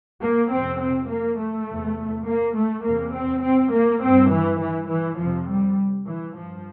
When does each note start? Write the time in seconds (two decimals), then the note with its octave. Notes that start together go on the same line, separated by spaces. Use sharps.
0.22 A#3
0.51 F2 C3 C4
0.81 C4
1.10 A#3
1.38 A3
1.69 E2 C3
2.27 A#3
2.56 A3
2.85 E2 C3 A#3
3.15 C4
3.43 C4
3.73 A#3
4.02 G2 C4
4.32 E3
4.61 E3
4.89 E3
5.19 F2 C3 F3
5.48 G3
6.07 E3
6.36 G2 F3